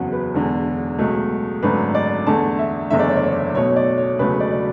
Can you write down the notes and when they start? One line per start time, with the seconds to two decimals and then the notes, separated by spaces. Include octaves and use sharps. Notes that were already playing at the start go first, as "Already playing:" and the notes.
Already playing: F#1 E2 C#3 F#3 F#5
0.13 B4
0.34 E1 E2 D3 A4
0.98 C#2 B2 F#3 A3
1.63 G#1 F#2 D3 A3 B4
1.95 D5
2.27 E2 D3 A3 A5
2.59 E5
2.91 F#1 E2 D3 A3 E5
2.99 D5
3.08 C#5
3.17 D5
3.54 B1 B2 A3 C#5
3.71 C#5
3.76 D5
3.98 C#5
4.19 E1 D2 C#3 F#3 A3 B4
4.40 D5
4.52 D5